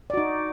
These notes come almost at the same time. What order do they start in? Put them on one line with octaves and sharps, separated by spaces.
D5 F#4 D#4